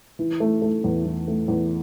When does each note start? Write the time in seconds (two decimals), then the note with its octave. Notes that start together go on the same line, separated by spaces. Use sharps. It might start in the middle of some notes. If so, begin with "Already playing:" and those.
0.19 E3
0.40 A3
0.62 A3
0.84 E2
1.05 E2
1.28 A3
1.48 E2